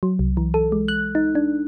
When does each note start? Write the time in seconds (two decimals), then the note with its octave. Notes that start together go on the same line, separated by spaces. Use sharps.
0.03 F#3
0.19 C2
0.37 E3
0.54 A4
0.72 G#3
0.88 F#6
1.15 D#4
1.35 D4